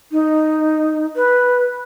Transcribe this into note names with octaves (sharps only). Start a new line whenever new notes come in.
D#4
B4